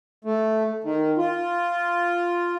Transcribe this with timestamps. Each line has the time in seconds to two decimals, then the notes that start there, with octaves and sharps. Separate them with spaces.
0.25 A3
0.84 D#3
1.18 F4